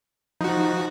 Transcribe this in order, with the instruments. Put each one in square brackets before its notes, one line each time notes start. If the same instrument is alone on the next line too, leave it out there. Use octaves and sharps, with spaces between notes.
[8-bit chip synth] F3 F#4 [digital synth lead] D#4